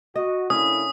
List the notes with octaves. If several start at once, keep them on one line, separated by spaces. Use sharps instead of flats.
F#4 D#5
D3 A#3 C#4 E4 D#6